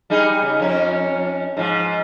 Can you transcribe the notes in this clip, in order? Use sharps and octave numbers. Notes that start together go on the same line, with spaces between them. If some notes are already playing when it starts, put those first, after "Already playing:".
G3 D#4 G#4
C#3
F2 C#4
G#2 F3